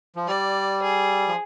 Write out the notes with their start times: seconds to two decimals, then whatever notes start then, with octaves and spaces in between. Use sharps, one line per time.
0.16 F3
0.28 G3 D5
0.82 G#4
1.28 F3